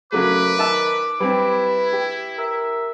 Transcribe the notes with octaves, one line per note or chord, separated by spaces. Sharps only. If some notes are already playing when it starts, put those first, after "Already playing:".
F#2 C#3 F#3 A3 B4 D6
D#3 E5 A5 E6
G3 C4 E4 B4
G4
A#4 E5